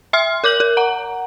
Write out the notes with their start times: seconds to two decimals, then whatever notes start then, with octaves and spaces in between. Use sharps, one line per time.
0.13 E5 C6 F6
0.44 A#4 D6 G6 F#7
0.60 A#4
0.77 F#5 A#5